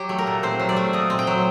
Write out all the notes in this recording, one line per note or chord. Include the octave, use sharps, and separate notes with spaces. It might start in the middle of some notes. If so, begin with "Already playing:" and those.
Already playing: F#3 G4
A3
A#4
A#2
C4 C5
F#3
D5
A3
A#2 D#5
C4
G5
F#3